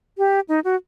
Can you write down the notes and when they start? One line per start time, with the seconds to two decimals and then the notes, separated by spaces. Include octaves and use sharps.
0.18 G4
0.49 D#4
0.64 F#4